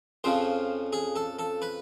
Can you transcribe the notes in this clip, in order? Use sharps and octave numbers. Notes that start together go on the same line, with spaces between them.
F2 C#3 F3 C5
G#4
A4
A4
B4